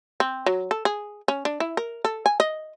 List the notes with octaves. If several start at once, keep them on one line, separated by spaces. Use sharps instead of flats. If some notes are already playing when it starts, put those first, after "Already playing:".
C4
F#3
A4
G#4
C#4
D4
E4
A#4
A4
G#5
D#5